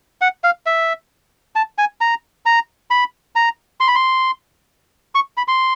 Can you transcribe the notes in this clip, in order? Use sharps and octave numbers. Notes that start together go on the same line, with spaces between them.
F#5
F5
E5
A5
G#5
A#5
A#5
B5
A#5
C6
B5
C6
C#6
B5
C6